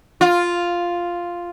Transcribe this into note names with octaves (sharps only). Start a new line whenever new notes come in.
F4